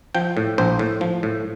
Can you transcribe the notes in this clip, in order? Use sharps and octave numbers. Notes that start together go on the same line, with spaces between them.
F3 G5
A2
A#1 C5
A2
F3
A2